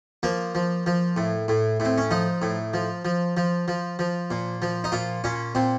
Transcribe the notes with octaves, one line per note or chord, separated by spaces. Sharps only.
F3 A#3
F3
F3
A2
A2
A2 C4
C#4
F3 D#4
A2
F3
F3
F3
F3
F3
A#2
F3
D#4
A#2 F4
A#2 C#4
A#2 C4